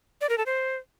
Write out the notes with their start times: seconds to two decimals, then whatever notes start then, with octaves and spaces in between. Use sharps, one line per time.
0.21 D5
0.29 A#4
0.38 A4
0.46 C5